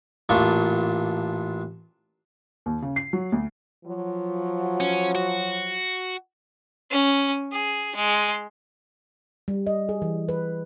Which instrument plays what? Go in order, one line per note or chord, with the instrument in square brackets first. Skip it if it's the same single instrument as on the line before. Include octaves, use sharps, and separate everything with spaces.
[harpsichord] A1 A#2 D4 F4 C#6
[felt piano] D#2
C#3
C7
F#3
D2
[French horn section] F3 F#3
[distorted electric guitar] C#4
F#4
[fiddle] C#4
G#4
G#3
[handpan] G3
D#5
G#4
E3
B4